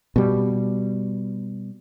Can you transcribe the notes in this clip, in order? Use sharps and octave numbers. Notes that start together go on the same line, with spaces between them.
B2 G3